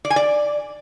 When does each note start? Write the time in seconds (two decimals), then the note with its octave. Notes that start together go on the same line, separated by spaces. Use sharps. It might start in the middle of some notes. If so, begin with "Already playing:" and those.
0.05 D5
0.10 G#5
0.16 D5